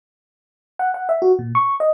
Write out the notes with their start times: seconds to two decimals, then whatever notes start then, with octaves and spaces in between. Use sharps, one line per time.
0.79 F#5
0.94 F#5
1.09 E5
1.22 F#4
1.39 A#2
1.55 C#6
1.80 D#5